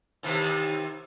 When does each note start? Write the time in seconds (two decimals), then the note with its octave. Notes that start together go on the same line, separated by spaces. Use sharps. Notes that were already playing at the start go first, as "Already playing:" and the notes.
0.23 D#2 C3 E3